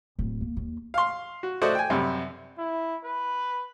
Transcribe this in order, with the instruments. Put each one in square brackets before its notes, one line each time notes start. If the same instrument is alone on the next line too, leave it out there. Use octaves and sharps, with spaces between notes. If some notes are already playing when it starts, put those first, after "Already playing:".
[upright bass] D1
A#3
D#2
[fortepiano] F5 C6
F#4
A3 F#4 C5 D5 D#5 F#5
G5 G#5
F#2 C3 G3
[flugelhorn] E4
B4